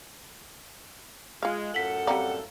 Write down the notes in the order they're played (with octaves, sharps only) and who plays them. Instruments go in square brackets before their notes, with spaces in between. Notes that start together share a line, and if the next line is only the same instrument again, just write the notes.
[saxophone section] G#3 [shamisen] F4 F5
[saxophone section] F#2 A2 A4 [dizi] F#5 [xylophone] B6 F#7
[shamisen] G3 C4 D5 [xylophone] F5 A#5